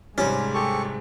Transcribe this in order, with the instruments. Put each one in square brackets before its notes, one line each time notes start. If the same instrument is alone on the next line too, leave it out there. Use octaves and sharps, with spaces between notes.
[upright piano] G#2 C3 G3 [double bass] G#3 [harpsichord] C#4
[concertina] G4 A4 C#6